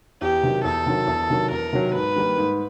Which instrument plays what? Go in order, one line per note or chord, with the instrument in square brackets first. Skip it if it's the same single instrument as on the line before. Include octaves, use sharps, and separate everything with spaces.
[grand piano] E2 [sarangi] G4
[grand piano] C3 D#3 F#3
[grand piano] E2 [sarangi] A4
[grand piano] C3 D#3 F#3
E2
C3 D#3 F#3
[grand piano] E2 [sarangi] A#4
[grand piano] C3 D#3 F#3
[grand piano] G#2 [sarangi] B4
[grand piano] D#3 G3 A#3
G#2